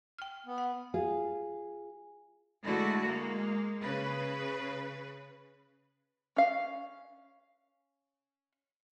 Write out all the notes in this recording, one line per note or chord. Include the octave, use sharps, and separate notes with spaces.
G5 F6
B3
F#5
F4 G#4
D3 G#3 A3 E4 F#4
G#3 A#3
C#3 B4
C#4 F5